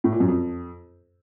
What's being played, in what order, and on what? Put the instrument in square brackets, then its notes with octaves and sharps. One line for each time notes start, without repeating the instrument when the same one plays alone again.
[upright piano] A2
A#2
F#2
F2